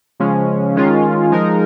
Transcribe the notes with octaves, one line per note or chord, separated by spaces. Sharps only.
C#3 F3 G#3 C#4
D#3 G#3 C#4 F4
F3 G#3 D#4 A#4